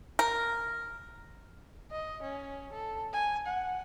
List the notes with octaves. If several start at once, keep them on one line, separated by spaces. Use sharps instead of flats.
A#4
D#5
C#4
A4
G#5
F#5